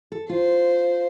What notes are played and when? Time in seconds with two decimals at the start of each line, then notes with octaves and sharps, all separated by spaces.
0.12 A4
0.29 F4 C5